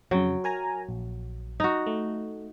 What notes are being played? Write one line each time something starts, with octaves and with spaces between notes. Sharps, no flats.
F2 C#3 F#3 G5
A#4 G#5 A#5
A#1
D#4 F#4
A3